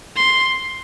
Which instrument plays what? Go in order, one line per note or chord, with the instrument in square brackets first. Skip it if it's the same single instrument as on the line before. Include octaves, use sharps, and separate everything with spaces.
[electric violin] C6